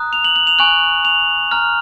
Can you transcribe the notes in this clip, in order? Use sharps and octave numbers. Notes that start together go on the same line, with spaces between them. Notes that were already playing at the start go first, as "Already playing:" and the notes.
Already playing: A#5 D#6 F#6
F7
F#7
F#7
F7
G#5 C#6 F#6 F#7
F7
A#5 F6